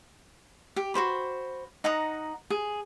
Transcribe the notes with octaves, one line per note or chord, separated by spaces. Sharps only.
G4
F#4 G4 C5 B5
D#4 F#5 A#5 D#6
G#4